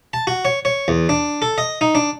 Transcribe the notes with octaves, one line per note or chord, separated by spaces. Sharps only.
A5
F#4
C#5
C#5
E2
D4
A4
D#5
D#4
D4